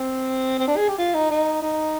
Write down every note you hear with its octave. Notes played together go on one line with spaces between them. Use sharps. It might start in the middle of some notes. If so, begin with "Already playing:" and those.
Already playing: C4
C4
D4
G#4
G4
F4
D#4
D#4
D#4